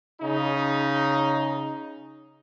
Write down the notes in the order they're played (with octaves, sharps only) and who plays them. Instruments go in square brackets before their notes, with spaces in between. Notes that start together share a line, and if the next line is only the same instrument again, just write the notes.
[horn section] C#3 D#4